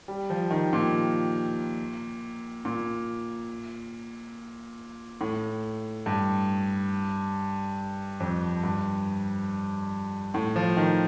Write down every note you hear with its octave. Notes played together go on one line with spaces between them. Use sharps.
G3
F3
D#3
A#2
A#2
A2
G2
F2
G2
A2
F3
D#3